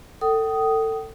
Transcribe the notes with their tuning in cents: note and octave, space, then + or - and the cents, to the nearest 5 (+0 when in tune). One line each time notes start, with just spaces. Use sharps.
A4 +25 G5 -35 D#6 +0